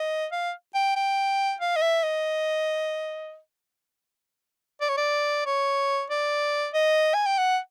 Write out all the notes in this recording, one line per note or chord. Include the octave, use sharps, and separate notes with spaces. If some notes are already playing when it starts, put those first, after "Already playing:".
Already playing: D#5
F5
G5
G5
F5
D#5
E5
D#5
D5
C#5
D5
C#5
D5
D#5
G#5
G5
F#5